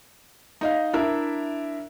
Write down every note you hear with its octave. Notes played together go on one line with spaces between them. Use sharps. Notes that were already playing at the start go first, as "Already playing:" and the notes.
D#4 D#5 F5
D4 E4 A#4 E5